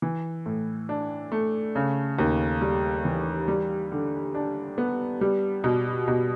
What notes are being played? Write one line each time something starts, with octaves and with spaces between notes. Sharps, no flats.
E3
A2
D4
A3
C#3
D#2
G3
E3
G3
D3
D4
B3
G3
B2
B2